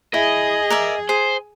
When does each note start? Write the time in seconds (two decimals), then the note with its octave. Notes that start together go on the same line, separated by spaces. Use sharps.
0.14 E4 G#4 D#5
0.70 A#4 D5 E5
1.09 G#4 C5